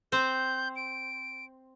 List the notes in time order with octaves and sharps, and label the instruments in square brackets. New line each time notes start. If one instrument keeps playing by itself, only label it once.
[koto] C4 C5 [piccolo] G6
[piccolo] D7